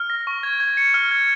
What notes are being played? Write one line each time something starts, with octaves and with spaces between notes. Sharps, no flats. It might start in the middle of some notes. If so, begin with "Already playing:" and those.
Already playing: F6
A#6
C#6
G#6
G#6
C#7
F6
G#6